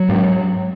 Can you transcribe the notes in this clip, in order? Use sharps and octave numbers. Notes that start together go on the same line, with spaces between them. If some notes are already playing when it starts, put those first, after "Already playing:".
Already playing: F#3
G#2